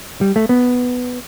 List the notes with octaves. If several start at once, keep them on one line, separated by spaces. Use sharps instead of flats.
G3
A3
B3